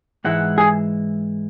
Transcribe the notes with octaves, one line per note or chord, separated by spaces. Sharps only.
G#2 E3 G#3 E4 F#5
G#4